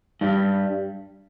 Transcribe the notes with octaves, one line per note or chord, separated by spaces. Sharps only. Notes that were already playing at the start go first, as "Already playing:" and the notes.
G2 G3